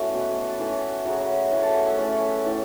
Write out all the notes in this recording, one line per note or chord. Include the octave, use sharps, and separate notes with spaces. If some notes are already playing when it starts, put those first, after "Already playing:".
Already playing: E3 A3 C#4 F#4 A4
B2 B3
C#5
B4
A4
E3 A3 C#4 F#4
C#3 F#3 A3 C#4 F#4
E3 A3 C#4 F#5
A5
F#5
E5
E3 A3 C#4 C#5
B4
A2 E3 A3